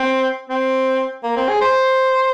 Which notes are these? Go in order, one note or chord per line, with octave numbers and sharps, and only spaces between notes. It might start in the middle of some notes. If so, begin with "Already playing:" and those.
Already playing: C4
C4
A#3
C4
G#4
C5